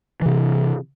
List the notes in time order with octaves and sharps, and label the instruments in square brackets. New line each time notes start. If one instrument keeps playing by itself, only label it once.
[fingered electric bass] C3 E3